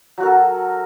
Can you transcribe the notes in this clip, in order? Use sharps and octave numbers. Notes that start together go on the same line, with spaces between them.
F#3 F#4 A4 A#4